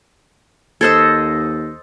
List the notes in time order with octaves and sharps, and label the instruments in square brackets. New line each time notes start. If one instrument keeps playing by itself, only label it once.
[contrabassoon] D#2 [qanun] A4 C5 D#5 [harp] E6 G#6